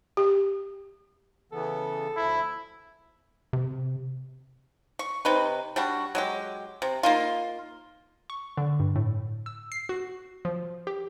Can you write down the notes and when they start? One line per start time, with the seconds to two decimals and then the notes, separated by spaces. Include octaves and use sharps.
0.17 G4
1.52 C#3 E3 B3 A4
2.16 D2 F3 E4
3.53 C3
4.99 C#6
5.25 C3 D#4 B4
5.76 G3 D4 F#4
6.15 F#3 G#3 G4
6.82 C3
7.03 A#3 D#4 F4
8.30 C#6
8.57 D3
8.80 G2
8.96 A2
9.46 E6
9.72 C7
9.89 F#4
10.45 F3
10.87 G4